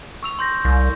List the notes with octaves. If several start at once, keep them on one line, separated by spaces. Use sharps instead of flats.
C#6 E6 F7
C6 G6 A#6
C2